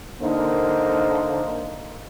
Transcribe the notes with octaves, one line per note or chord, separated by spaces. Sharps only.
D3 A#3 D#4 A#4 C5